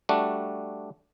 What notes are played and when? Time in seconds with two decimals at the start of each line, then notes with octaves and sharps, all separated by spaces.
0.09 G3 A3 D4 F#4